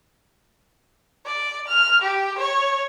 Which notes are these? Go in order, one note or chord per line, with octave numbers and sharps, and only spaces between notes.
D5
F6
G4
C#5